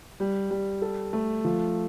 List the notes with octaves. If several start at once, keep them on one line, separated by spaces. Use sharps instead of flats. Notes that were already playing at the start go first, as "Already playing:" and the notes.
G3
G3
A4
A3
F3